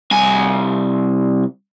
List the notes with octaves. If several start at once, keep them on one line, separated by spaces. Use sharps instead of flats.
C2 G#5